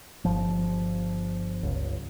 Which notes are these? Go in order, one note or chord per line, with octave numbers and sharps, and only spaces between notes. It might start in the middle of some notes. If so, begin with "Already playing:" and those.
G1 F3
G1 C#2